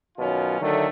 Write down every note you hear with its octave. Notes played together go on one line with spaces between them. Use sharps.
F#2 B2 D#3 F#3 C#4 F4
D3 D#3 F#3 A3